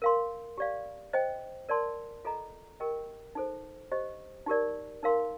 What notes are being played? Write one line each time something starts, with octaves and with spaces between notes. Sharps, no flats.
A#4 F5 C6
G4 D5 F5
C5 D#5 G5
A#4 D5 A5 C6
F4 A4 D#5 A#5
G4 A#4 D#5 G5
D#4 A4 C5
G4 C5 D#5
D#4 G4 A#4 D5
D#4 A#4 F5 C6